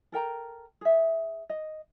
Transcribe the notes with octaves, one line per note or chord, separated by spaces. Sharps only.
A4 A#4 G5 A#5
G#4 E5
D#5